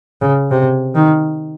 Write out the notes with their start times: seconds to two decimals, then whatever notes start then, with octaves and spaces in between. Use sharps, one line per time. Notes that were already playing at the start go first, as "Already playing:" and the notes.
0.21 C#3
0.51 C3
0.95 D#3